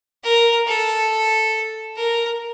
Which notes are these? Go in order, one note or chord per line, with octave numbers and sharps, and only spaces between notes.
A#4
A4
A#4